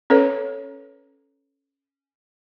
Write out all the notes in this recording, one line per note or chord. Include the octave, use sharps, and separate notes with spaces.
C#4 A4 B4 C#5